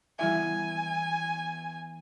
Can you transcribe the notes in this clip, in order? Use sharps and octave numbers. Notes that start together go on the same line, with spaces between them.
E3 G3 B3 E4 E5 G#5